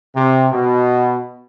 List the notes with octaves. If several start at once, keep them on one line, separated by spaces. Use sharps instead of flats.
C3
B2